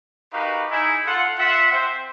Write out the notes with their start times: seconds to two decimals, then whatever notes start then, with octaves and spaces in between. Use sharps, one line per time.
0.33 D#4 F#4 G4 A#4 B4 F5
0.71 D#4 E4 G#4
1.06 F4 A4 F#5
1.39 F4 E5 F#5
1.72 C4 C5 E5